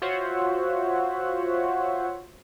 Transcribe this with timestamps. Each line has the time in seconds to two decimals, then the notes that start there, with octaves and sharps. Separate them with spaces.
0.02 F4 F#4 C5 C#5 E5 F#5